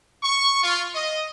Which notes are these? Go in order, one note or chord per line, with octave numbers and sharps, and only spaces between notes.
C#6
F4
D#5